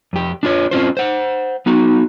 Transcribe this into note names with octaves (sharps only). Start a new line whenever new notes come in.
F2 G4
D4 F4 C#5
C4 C#4 F4 C5
C5 F#5
B3 D#4 F#4